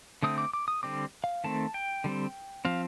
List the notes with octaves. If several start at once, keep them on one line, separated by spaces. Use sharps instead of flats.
D3 A3 C4 D#6
D6
D6
D#6
D3 G3 C4 D6
F5
D#3 A3 C4 A5
G5
D3 G3 C4
F3 C4 F5